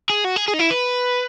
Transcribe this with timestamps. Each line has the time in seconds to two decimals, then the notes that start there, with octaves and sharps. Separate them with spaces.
0.10 G#4
0.25 F#4
0.36 G#4
0.48 G#4
0.54 D#4
0.59 E4
0.71 B4